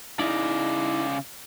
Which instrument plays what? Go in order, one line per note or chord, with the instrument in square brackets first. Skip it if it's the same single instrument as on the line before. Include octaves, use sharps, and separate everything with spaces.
[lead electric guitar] C#3 D5 [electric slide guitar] D#4 E4